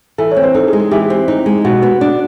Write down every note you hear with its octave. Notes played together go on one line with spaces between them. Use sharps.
E3 A4
C#5
C4
C5
D#4 A4
G#4
G#3
G#4
E3 G4
C4
D#4
G#3
B2 F#4
B3
D4